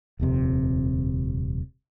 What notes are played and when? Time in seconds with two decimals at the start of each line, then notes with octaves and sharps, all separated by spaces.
0.19 D#1 F2 C3